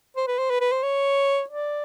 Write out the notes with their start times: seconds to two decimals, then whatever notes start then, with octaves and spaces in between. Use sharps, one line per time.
0.16 C5
0.27 B4
0.39 C5
0.50 B4
0.61 B4
0.72 C5
0.83 C#5
1.49 D5